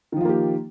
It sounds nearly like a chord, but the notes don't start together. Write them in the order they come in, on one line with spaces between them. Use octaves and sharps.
D#3 F3 F4 A#3 G4